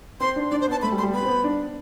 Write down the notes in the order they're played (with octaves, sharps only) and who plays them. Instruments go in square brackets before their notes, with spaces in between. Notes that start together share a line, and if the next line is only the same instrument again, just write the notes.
[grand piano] C4 [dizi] C6
[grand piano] D4
[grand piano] D4 [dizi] D5
[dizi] C5
[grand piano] B3 [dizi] A5
[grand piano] A3 [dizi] B5
[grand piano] G3
[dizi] C6
[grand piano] G3
[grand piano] B3 [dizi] B5
[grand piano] C4
B3
D4